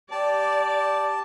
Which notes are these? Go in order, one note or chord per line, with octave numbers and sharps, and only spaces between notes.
G4 D5 A5